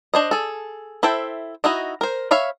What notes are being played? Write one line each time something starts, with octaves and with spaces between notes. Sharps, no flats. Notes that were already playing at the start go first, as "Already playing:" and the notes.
D4 C5 D#5
G#4 A4
E4 A4 C5 E5 G5
D#4 E4 F#4 D#5
A#4 C5
C#5 E5 F5 B5